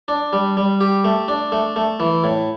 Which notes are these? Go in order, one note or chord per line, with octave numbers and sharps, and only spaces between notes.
D4
G3
G3
G4
A3
D4
A3
A3
E3
A2